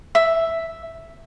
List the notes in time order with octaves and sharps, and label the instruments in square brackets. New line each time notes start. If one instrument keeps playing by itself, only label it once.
[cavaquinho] E5